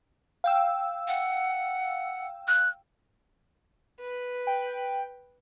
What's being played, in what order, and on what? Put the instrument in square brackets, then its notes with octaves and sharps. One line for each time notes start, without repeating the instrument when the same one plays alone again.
[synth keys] F5 G5 E6
[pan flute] F#5
F#6
[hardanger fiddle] B4
[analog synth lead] G5